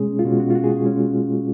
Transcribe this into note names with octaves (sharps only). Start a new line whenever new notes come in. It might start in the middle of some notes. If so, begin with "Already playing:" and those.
Already playing: B2 G#3 C#4 G#4
F4
B2 G#3 C#4 F#4
F#4
F4
F#4
G#4
F#4
B2 G#3 C#4